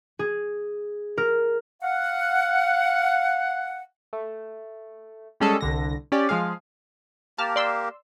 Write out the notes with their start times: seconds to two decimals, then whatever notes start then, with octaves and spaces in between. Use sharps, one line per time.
0.19 G#4
1.18 A#4
1.82 F5 F#5
4.13 A3
5.40 G3 G#3 C#4 G#4 A4
5.61 C2 D3 A#6
6.12 C#4 G4 D5
6.29 F3 G#3 G#4 F5
7.38 A#3 G4 A#4 A5 F6
7.56 D5 C6 E6